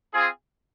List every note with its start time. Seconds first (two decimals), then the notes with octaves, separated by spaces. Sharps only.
0.14 C4 F4 G#4